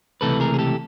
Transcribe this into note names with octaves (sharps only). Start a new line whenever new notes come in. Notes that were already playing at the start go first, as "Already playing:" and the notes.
C#2 C3 E3 A3 A4 B4
G#4 A#4
G#4
G4 A4